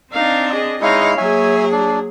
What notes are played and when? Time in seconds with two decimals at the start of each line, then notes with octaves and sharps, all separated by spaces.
0.13 C4 D4 D#4 F5
0.52 G#4 D#5
0.81 G#3 D#4 E4 C#5 D#5 F5
1.18 F#3 A#3 G#4 C#5 E5 G#5
1.72 D4